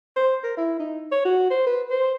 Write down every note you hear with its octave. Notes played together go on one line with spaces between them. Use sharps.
C5
A#4
E4
D#4
C#5
F#4
C5
B4
C5